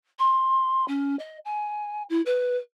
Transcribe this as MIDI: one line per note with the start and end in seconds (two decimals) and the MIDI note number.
0.19 0.85 84
0.88 1.16 61
1.19 1.38 75
1.45 2.03 80
2.09 2.21 64
2.26 2.57 71